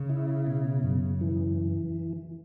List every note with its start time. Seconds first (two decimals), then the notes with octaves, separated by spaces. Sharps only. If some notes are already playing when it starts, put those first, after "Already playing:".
Already playing: C#3
0.09 E4
0.47 B2
0.83 F#2
1.21 E3